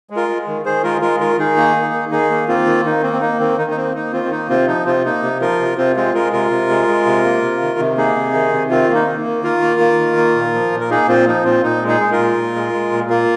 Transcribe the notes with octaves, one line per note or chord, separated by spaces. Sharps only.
G#3
F4 A#4
G#3
D#3
D#3 G#4 C5
G#3 F4 A#4
G#3 F4 A#4
D#3 F4 A#4
D#3 D#4 G#4
A#3
A#3
D#3
D#3 D#4 G#4
A#3
A#3 C4 F4
D#3
D#3 D#4
A#3 C4
C4
A#3 D#4
D#3 C4
D#3 D#4
D#4
A#3 C4
A#3 D#4
D#3 C4 F4
C4
A#3 D#4
C3 C4 F4
F3 D#4
C3 C4 F4
A#3 D#4
C3
F3 F4 A#4
C3
C3 C4 F4
G#3 C4 F4
G#3 F4 A#4
C3 F4 A#4
C3
G#3
G#3
C3
A#3
C3
D#3
C3
A#3 D#4 G#4
C3
D#3
C3
D#3 C4 F4
A#3
D#4
A#3
D#3
D#3 F4 A#4
A#3
A#3
D#3
A#3
A#2
F3
A#2
A#4
A#3 D#4 G#4
A#2 C4 F4
F3 D#4
A#2 C4 F4
A#2 D#4
G#3
D#4 G#4
G#3
F4 A#4
A#2
A#2
G#3
G#3
A#2
A#3 F4 A#4